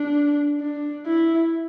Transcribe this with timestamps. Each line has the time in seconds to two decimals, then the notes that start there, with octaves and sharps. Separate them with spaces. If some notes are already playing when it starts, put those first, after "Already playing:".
Already playing: D4
0.61 D4
1.06 E4